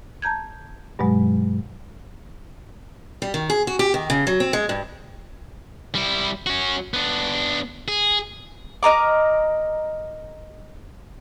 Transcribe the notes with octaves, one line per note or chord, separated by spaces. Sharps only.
A5 A#5 G6 G#6
G2 B2 F#3 G#3
G3
D#3
G#4
F#4
G4
D#3
C#3
F#3
C4
G#3
G2
G3 E4
C#4 F#4
B3 D4
G#4
A#4 D#5 A#5 D6